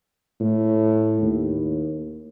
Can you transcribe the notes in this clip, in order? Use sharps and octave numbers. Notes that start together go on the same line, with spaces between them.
A2
D#2